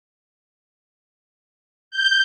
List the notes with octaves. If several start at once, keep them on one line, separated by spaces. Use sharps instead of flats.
G6